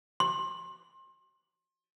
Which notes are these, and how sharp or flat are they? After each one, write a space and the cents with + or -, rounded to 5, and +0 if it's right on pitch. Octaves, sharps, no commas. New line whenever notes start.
C6 +30